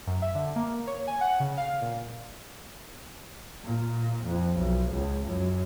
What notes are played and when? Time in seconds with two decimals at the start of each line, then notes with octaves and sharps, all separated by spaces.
0.07 F#2
0.22 E5
0.35 D3
0.56 A#3
0.87 C#5
1.07 G#5
1.21 F#5
1.40 C#3
1.57 F5
1.82 A#2
3.65 A#2
4.24 F2
4.58 B1
4.91 C#2
5.26 F#2